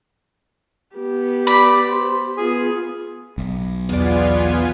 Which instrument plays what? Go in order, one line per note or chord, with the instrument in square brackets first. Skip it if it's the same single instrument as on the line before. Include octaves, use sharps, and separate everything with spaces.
[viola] B3 G4
[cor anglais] D5 [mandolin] B5
[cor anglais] C5
[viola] B3 F4 [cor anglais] G#4
[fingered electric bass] B1
[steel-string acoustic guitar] E2 D5 [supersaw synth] B3 F4 G#5